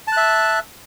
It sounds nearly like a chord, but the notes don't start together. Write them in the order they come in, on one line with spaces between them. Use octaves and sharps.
A5 F#6 E5